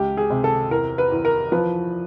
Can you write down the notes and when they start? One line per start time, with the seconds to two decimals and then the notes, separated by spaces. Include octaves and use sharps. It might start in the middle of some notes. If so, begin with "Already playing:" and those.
Already playing: C#2 G4
0.17 G#4
0.30 C3
0.44 A4
0.71 E2 A#4
0.98 B4
1.12 E2
1.25 A#4
1.52 F3 B4